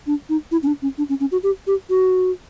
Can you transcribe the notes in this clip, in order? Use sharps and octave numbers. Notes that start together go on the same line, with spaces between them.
D4
D#4
E4
C#4
D4
C#4
D4
C#4
C#4
F#4
G4
G4
F#4